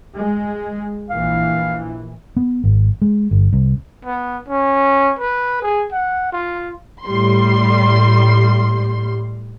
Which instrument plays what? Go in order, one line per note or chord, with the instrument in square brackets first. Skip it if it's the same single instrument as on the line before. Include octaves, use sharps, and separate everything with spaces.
[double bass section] G#3
[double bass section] A#1 E3 [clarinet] F5
[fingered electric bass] B3
G#1
G#3
G1
C2
[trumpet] B3
C#4
B4
G#4
F#5
F4
[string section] A2 G3 C6